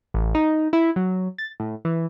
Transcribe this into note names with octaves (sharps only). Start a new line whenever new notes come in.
A1
D#4
E4
F#3
A6
A2
E3